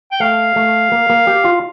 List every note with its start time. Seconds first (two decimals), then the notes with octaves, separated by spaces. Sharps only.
0.12 G5
0.20 A3 F5
0.56 A3
0.92 A#3
1.10 A#3
1.27 G4
1.45 F4